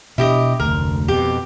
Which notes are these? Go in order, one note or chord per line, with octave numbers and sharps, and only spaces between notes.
B2 D4 E4 G4 D#5
F1 D2 A#4
F2 B2 G4